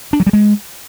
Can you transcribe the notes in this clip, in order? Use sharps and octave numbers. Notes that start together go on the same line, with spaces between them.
D4
F#3
G3
G#3